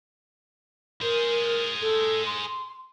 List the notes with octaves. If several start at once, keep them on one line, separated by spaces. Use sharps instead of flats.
G#4 A#4 C5
A4
C6